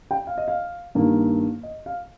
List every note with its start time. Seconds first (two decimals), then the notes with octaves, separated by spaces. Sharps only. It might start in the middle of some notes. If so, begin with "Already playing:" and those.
0.11 G5
0.27 F5
0.38 D#5
0.48 F5
0.95 G2 D#3 A#3
1.63 D#5
1.86 F5